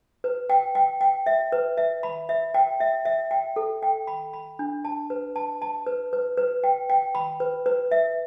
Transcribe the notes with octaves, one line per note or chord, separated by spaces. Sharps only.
B4
G5
G5
G5
E5
B4
E5
B5
E5
G5
E5
E5
G5
A4
G5
B5
B5
D4
A5
B4
A5
A5
B4
B4
B4
G5
G5
B5
B4
B4
E5